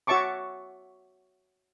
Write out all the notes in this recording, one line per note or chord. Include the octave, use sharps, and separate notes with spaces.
F#4 C#5 E5 A5 C#6 D6